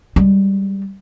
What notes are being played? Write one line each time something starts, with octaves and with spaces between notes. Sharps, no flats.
G3 G#3